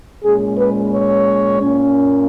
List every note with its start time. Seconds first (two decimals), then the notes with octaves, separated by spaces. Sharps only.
0.22 A#2 G#3 C#4 G#4
0.58 B4
0.93 C#5
1.61 A#2 A#3 C#4